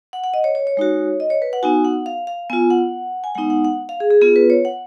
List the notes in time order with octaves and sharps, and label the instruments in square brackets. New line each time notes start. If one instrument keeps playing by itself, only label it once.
[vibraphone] F#5
F#5
D#5
C#5
C#5
C#5
G#3 D#4 F#4
D#5
C#5
B4
F#5
B3 D#4 F#4 G#5
F#5
F5
F5
B3 F4 G#5
F#5
G#5
G#3 B3 D#4 F#5
F#5
F#5
F5
G#4
G#4
B3 F4 G#4
B4
C#5
F#5